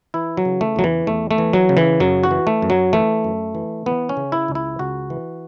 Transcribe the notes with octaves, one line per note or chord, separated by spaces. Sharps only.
E3 E4
F#3
C#3
A3
E2 F#3
E3
E2 A3
A3
E3
F#3
C#3
E3
F#2 F#3
F#4
E3
A3
F#2
F#3
E3 A3
F#2
E3
E3 B3
C#4
C#3
E4
C#2
E4
C#2 F#4
E3